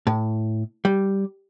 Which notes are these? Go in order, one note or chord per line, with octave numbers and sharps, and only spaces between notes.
A2
G3